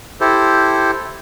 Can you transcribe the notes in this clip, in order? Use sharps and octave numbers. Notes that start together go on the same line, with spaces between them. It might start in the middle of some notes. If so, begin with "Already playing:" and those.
E4 G4 A4 C5